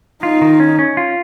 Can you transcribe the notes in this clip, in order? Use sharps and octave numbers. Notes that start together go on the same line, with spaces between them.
D#4 F4
D#3
C#4
C#4
F4